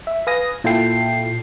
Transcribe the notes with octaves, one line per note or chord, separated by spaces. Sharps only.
E5
B4 F5 G#5 D#6 A#6
A#2 E4 F4 A4 G5 C7